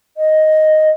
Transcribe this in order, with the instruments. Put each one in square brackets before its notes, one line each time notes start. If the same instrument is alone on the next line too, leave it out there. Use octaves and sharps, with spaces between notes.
[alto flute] D#5